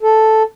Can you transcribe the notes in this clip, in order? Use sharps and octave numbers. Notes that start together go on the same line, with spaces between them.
A4